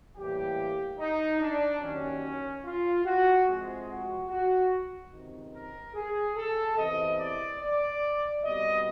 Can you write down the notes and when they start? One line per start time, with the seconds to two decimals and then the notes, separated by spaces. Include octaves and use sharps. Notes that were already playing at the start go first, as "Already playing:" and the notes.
0.16 A2 E3 G3 A#3 G4
0.98 D#4
1.40 D4
1.81 D#2 D#3 F#3 C#4
2.64 F4
3.05 F#4
3.47 F2 C3 F3 G#3
3.88 F#4
4.29 F#4
5.12 C#2 C3 D#3
5.54 A#4
5.95 G#4
6.36 A4
6.77 E2 C3 E3 D#5
7.18 D5
7.60 D5
8.43 C2 B2 G3 D#5